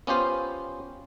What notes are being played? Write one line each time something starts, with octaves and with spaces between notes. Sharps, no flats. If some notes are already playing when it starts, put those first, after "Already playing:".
B3 C#4 F4 G4 C5